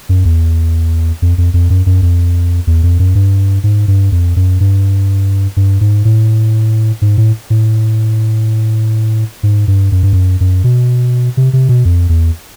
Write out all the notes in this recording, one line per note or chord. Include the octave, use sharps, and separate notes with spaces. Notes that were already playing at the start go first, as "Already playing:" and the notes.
F#2
E2
F2
F2
F2
F#2
F#2
F2
E2
F2
F#2
G2
G#2
G2
F2
F#2
G2
G2
G#2
A2
G#2
A2
A2
G#2
G2
F#2
G2
F#2
F#2
B2
C3
C3
B2
F2
E2